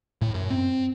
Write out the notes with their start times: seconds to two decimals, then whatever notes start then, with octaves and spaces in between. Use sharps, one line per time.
0.21 A2
0.34 F#2
0.50 C4